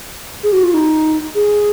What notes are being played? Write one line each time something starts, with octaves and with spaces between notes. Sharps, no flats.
G#4
F#4
F4
D#4
G#4